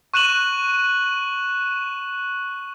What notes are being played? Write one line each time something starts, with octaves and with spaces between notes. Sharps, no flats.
C#6 F#6 D#7 E7 F#7